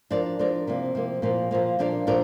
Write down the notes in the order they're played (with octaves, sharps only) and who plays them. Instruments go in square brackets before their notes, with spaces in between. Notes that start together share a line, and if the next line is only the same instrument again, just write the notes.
[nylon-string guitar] F3 D4 A#4 D5
F3 D4 A#4 D5
C3 F3 A#3
C3 F3 A#3
A#2 F3 A#3
A#2 F3 A#3
A#2 F3 D4 A#4 D5
A#2 F3 D4 A#4 D5